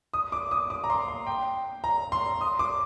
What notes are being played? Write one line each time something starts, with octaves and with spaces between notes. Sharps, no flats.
D#6
D6
D#6
D6
A#5
C6
C6
G5
A#5
C6
D#6
D6